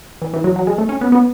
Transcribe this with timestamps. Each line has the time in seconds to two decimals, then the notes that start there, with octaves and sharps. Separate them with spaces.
0.22 E3
0.34 E3
0.44 F#3
0.56 F#3
0.67 G#3
0.78 A3
0.89 C#4
1.01 B3
1.12 B3